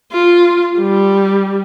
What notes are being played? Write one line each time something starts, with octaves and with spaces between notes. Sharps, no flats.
F4
G3